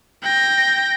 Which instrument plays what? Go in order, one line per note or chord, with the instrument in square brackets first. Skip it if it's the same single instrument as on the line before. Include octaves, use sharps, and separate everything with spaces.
[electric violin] G5 A#6